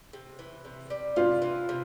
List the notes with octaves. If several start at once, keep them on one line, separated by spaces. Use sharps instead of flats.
C3
E3
C3
G3
C3 F4
E3
C3